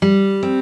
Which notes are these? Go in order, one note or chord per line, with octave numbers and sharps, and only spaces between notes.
G3
C4